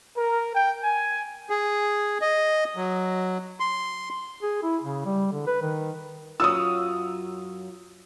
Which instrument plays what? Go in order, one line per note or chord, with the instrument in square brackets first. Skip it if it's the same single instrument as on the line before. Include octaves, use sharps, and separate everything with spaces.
[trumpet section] A#4
G5
G#5
[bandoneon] G#4
D#5
F#3
C6
[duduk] G#4
E4
C#3
G3
D3
B4
D#3
[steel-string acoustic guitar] F#2 F#3 F4 [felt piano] D#6 E6